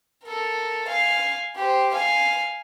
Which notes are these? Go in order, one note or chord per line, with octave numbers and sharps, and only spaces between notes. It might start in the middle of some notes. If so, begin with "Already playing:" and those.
A4 A#4
F5 G#5
G4 C5
F5 G#5